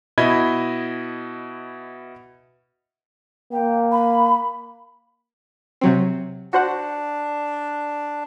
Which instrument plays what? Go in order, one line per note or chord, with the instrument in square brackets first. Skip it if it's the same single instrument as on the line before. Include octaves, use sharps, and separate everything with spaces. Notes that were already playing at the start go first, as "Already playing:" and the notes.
[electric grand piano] B2 E4 D#5 B5 G#6
[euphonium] A#3 [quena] G5
[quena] B5
[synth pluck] C3 F#3 C4
[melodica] D4 [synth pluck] F#4 C5 F#5